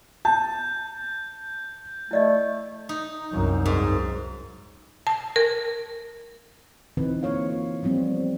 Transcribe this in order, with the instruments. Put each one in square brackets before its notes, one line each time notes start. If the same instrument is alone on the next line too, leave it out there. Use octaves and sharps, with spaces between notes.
[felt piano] A5 [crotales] G6
[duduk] A3 [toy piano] E4 D5 D#5
[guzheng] D#4
[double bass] C2 F#2
[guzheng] G#2
[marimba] A5
A#4
[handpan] D3 E3 C4 D#4 B4
A#3 F4 C#5 F5
F3 G3 B3 C4